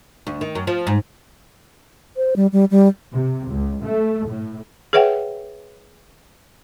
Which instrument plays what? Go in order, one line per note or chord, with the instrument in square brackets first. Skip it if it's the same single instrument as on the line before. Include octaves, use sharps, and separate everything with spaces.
[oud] D2
D#3
F#2
F3
G#2
[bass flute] C5
G3
G3
G3
[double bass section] C3
C#2
A3
A2
[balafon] G#4 B4 C#5 E5 F#5 G5